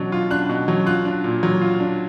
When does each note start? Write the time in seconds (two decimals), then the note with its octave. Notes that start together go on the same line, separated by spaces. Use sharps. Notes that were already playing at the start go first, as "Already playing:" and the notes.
Already playing: B2 F#3 D4
0.12 F4
0.31 D4 F#6
0.49 B2
0.68 F#3
0.86 F4 F#6
1.05 D4
1.24 A#2
1.43 F#3
1.61 F4
1.80 D4